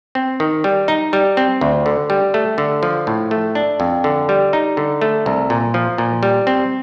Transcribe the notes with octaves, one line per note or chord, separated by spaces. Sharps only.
C4
D#3
G3
D#4
G3
C4
D2
D3
G3
A3
D3
F3
A2
A3
D4
F2
D3
G3
D#4
D3
A3
C2
A#2
F3
A#2
G3
C4